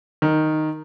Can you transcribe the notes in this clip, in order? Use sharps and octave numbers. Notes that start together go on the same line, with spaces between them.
D#3